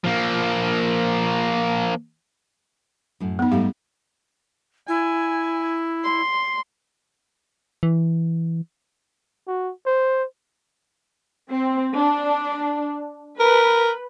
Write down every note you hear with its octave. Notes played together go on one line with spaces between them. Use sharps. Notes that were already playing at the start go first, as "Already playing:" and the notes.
F3 A#3
F#2 A2
B3 D#4
G#2 G3 A3 G4 F5
E4 G#5
C6
E3
F#4
C5
C4
D4
A#4 B4